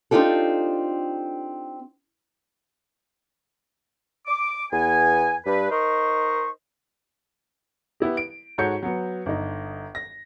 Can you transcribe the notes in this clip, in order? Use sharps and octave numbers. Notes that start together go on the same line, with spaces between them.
C4 D4 D#4 F4 G4 A4
D6
E2 B3 G#5
G2 B4
D#4 A#4 C5 D#5 C#6
B3 E4 G4
D7
G#2 F#4 A4 C#5 G6 C#7
F#3 B3
G1 D#4
A#6